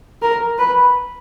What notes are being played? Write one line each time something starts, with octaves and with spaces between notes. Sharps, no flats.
A#4
B4